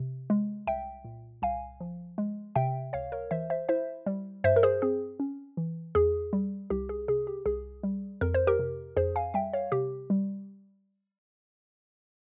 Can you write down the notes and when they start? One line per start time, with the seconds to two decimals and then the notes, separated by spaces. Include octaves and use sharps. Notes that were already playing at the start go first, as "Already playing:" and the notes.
Already playing: C3
0.30 G#3
0.67 C2 E5 G5
1.04 A#2
1.42 C2 F5 G#5
1.80 F3
2.18 G#3
2.56 C3 E5 G5
2.93 C#2 C#5 F5
3.12 A#4 C#5
3.31 E3 C5 E5
3.50 C5 E5
3.69 E4 C5 E5
4.06 G3
4.44 G2 C5 E5
4.56 A#4
4.63 G#4 C5
4.82 C4 G#4
5.20 C#4
5.57 E3
5.95 E2 G#4
6.33 G3
6.70 C2 G4
6.89 G#4
7.08 C3 G#4
7.27 G4
7.46 C2 G#4
7.83 G3
8.21 F2 A#4
8.34 C5
8.47 G4 A#4
8.59 C3
8.97 F2 G#4 C5
9.16 F5 G#5
9.34 G3 E5 G5
9.53 C#5 F5
9.72 C3 G4
10.10 G3